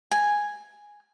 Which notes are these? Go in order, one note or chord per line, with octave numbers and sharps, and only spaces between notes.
G#5